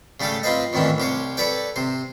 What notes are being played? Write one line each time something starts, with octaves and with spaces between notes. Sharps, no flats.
C#3 G3 A3 G4 A4
C4 F4 B4 C5 D#5
F2 A2 D#3 E3 C#4 D4
C2 G4 C5 C#5
A4 B4 C#5 D5 G5
C3 C5